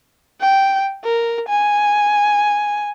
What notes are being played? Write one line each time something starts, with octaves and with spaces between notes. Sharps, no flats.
G5
A#4
G#5